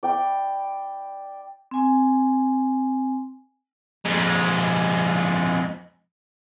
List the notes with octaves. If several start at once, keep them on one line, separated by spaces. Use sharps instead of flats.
D5 G5 B5
C4 G#5
F2 G#3